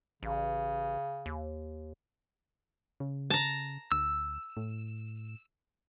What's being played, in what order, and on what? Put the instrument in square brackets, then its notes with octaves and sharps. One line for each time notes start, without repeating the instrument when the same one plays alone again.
[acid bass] A1 [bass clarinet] C#3
[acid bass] D#2
[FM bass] C#3
[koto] A5 A#5
[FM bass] D2 [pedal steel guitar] E6
[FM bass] A2